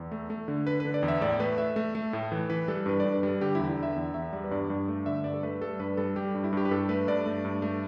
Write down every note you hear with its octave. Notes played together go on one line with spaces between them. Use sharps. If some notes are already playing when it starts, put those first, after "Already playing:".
Already playing: E2
A3
A3
D3
D3 B4
D3 B4
D5
E2
E5
A2 D5
A3 B4
A3 E5
A3
A3
A2
E3
E3 B4
G3 A4
G2 B4
G2 D5
B4
G3 A4
D3 G4
E2 E4
E4
D3
E5
E2
E2 E5
G3 D5
B4
G2 D5
G2
A3
D3 E5
G2 D5
A4
A3 B4
G3 A4
G2 B4
G3 A4
G3 G4
G2
E4
G2 G4
B4
G2 A4
A3 B4
G2 D5
A3
G2
A3